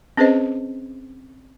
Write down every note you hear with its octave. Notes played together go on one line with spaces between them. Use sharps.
C4 C#4 G#4 B4 C5 D#5